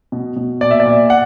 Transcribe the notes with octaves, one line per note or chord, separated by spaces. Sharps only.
B2
B2
A#2 D5
E5
D5
A#2
F#5